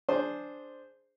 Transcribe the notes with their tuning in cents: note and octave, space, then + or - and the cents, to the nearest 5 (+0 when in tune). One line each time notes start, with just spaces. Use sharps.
D4 +0 G#4 +0 C5 +0